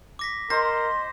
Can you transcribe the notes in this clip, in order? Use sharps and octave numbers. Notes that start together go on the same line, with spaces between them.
D6 A#6 B6
A#4 C5 D#5 C6 A#6